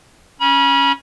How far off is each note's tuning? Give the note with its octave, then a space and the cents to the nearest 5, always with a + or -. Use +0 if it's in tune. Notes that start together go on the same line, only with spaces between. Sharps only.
C#4 +0 B5 -40